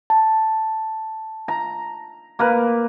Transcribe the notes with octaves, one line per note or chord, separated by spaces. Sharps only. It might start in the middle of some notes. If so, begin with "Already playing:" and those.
A5
A#5
A#3 A#4 B4